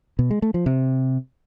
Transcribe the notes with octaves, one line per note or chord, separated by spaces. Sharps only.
B2
G#3
A3
F3
C3